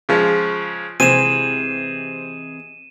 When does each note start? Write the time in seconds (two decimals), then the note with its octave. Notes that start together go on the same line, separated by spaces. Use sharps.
0.09 C#3 F3 G#3
1.00 C3 E3 G#3 C4 G#4 D#7 E7